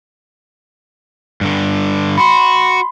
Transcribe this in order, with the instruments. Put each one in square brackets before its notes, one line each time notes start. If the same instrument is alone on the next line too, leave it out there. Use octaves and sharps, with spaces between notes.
[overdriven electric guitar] G2 D3
[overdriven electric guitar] F#4 [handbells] B5 C6